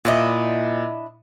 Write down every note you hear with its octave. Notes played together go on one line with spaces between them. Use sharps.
A#2 D4 E4 D#5